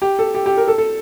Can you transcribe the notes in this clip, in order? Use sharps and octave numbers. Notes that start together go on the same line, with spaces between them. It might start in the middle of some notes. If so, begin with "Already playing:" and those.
G4
A4
G4
G4
A#4
A4
A4